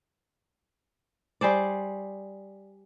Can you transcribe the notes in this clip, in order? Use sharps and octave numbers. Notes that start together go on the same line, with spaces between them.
G3 G#4 C5 D5